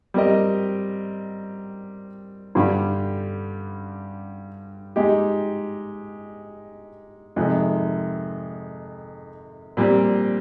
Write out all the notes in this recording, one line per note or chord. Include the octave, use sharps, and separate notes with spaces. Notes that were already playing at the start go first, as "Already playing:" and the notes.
G3 C4 G4 A#4 D#5
G2 D3 G3
G#3 D#4 G4
F2 C3 D#3 G#3
A#2 G3 C4 G4